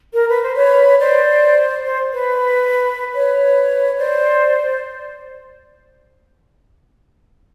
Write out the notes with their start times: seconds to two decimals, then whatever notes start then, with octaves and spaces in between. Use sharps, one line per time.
0.14 A#4
0.28 B4
0.42 C5
0.57 B4 C#5
0.99 C5 D5
1.85 C5
2.13 B4
3.13 B4 C#5
3.98 C5 D5